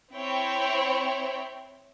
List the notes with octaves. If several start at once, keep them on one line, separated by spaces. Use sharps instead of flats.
C4 E4 C5 C#5 G5